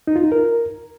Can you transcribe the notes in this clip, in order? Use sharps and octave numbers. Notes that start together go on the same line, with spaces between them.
D#4
F4
D#4
A#4